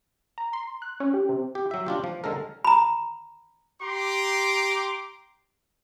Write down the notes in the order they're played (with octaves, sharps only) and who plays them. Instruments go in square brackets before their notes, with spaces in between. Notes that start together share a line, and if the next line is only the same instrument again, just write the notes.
[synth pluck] A#5
C6
F#6
C#4
G4
C3
[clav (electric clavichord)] G4
F#3 E5
D4 F4 G4
F3
D3 G#3 A4 A#4
[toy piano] A#5 B5
[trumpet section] G4 A#5 C6 D6